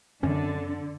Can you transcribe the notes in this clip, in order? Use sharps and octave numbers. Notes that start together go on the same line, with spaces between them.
F#2 D3 C4 C#4